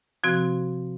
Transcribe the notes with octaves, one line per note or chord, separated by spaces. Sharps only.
C3 F3 C4 F#4